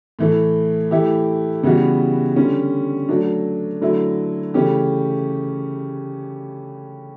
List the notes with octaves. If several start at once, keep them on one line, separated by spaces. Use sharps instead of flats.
A2 E3 A3
E3 A3 E4 G4
C#3 E3 G3 B3 F#4
D3 G3 C#4
F#3 A3 D4
D3 F#3 A3 E4
C#3 E3 A3 C#4 G4